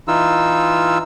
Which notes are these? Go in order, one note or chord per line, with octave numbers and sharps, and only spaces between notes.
E3 D#4 F4 E6